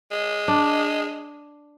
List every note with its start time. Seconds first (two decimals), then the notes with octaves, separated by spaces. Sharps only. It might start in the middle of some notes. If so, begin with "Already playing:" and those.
0.11 G#3
0.48 D4